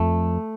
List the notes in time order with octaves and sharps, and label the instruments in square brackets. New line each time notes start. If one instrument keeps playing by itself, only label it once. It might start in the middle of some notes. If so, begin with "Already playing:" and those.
Already playing: [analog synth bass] F2 [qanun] A3